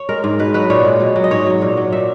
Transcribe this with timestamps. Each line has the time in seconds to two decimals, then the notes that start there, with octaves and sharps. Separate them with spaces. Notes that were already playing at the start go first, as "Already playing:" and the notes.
Already playing: C#5
0.09 G#3 A#4
0.24 G#2
0.39 B2 B4
0.54 F#3 B4
0.70 A#2 C#5
0.85 G#3
1.00 B2
1.16 F#3
1.24 D#5
1.31 G#2 C#5
1.46 F#3
1.62 A#2
1.77 F#3
1.92 A#2 E5